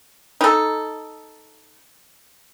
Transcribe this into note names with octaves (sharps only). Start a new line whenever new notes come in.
D#4 A4